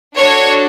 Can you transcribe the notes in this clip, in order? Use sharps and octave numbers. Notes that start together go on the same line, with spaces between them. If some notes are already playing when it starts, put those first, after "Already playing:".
D4 F#4 A4 C#5